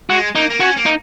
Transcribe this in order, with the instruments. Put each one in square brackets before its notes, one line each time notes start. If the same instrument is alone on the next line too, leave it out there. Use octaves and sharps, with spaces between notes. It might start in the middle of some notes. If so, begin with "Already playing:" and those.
[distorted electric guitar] G#3 [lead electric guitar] F#4
[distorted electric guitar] A#3 [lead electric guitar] D#4
[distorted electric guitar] A#3
[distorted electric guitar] C#4 [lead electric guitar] F#4
[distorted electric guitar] A#3
[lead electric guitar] D#4